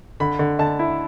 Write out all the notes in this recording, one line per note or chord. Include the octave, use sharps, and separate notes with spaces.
D3 B5
D3
D3 A5
E4